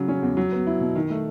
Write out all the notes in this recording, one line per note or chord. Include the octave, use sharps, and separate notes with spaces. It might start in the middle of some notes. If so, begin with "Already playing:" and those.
Already playing: C#3 F#3
C#4
E2
F#3
B3
E4
B2
D#3
A3